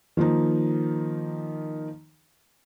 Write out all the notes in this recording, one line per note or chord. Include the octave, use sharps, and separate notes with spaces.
D#3 F3 A#3 D#4